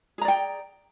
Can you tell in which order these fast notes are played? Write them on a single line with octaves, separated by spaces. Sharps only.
G#4 A#5 D5 G5